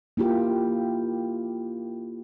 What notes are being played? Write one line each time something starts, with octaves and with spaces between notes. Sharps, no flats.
A#3 E4 F4 G4